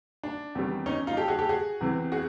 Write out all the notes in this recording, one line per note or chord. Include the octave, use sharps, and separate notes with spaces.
D4
E2 C3 D#3 G3
C#4 D#4
D#4 F4
G4 A4
F#4 G#4
G4 A4
F#4 G#4
E2 C3 E3
F#4 G#4